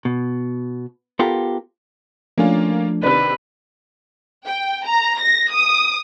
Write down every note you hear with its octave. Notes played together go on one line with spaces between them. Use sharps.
B2
B3 F4 G4 A4 A#4
F3 A3 A#3 C#4 D4 F4
C3 D#3 D4 B4
G5
A#5
A#6
D#6